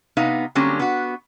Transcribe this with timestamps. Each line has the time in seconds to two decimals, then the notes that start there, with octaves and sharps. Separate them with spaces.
0.17 C3 B3 D#4 F5
0.55 D3 F#3 G3 A#3 C4 C#4
0.79 B3 F#4